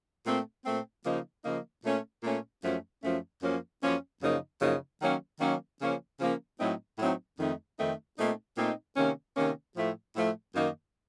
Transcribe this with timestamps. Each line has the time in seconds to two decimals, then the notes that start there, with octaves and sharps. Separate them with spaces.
0.25 A#2 A3 C4
0.65 A#2 A3 C4
1.04 C#3 F3 A#3 D#4
1.44 C#3 F3 A#3 D#4
1.84 A#2 A3 C#4
2.23 A#2 A3 C#4
2.63 F#2 F3 A3 C#4
3.03 F#2 F3 A3 C#4
3.42 F#2 F3 A#3 C#4
3.82 F#2 F3 A#3 C#4
4.21 F#2 C#3 F3 A#3 D#4
4.61 F#2 C#3 F3 A#3 D#4
5.01 D#3 F#3 A#3 C#4
5.40 D#3 F#3 A#3 C#4
5.80 C#3 F3 A#3 C#4
6.19 C#3 F3 A#3 C#4
6.59 A2 F#3 A3 C4 D#4
6.98 A2 F#3 A3 C4 D#4
7.38 F2 D#3 A3 C4 D#4
7.78 F2 D#3 A3 C4 D#4
8.17 A#2 A3 C4 D#4
8.57 A#2 A3 C4 D#4
8.96 C3 D#3 A#3 C#4
9.36 C3 D#3 A#3 C#4
9.76 A2 F3 A3
10.16 A2 F3 A3
10.55 F#2 D#3 A#3 D#4